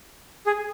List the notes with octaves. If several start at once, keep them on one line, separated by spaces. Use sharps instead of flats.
G#4